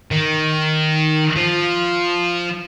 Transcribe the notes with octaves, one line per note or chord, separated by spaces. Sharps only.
D#3
F3